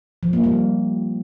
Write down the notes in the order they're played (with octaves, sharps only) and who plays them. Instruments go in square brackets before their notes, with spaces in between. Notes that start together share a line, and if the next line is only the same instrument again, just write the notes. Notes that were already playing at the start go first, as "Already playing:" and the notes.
[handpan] F3
A#3
G3